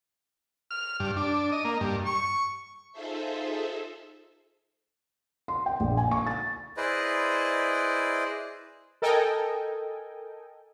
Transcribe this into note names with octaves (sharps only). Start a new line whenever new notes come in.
F6
G2
D4
D#5
A#3
G2
C#6
D#4 F4 G#4 A4 C5 E5
C6
G5
A#1
G#5
C#6
A6
E4 G#4 B4 C5 D5 D#5
A4 A#4 D#5 G5 G#5